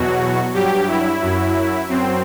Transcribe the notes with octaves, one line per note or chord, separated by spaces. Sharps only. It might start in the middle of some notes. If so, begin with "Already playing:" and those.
Already playing: E2 B2 F#3 F#4
G2 F#3 G4
E4
F#2 F#3
F#2 F#3 C4